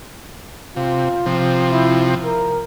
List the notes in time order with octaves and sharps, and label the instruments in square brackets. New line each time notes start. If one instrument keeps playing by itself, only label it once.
[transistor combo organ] C3 [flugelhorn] F4
[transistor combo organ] C3 F3
[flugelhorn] E4
A#4